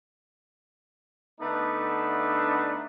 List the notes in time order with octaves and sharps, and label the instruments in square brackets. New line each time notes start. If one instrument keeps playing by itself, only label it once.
[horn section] D3 A3 B3 D4 D#4